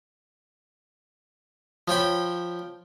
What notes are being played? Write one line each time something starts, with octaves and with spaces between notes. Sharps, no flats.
F3 C#5 G5 B5